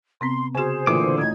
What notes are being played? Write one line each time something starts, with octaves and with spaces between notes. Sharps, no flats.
C3 B3 C4 C6
C#3 F#4 G#4 C5 G#5 E7
A#2 D3 E3 A3 F4 D6 D#6
A1 D#4 D#6 G#6